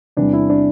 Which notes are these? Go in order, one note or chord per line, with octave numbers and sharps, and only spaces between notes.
E2 C3 E3 G3 D4
E4
D4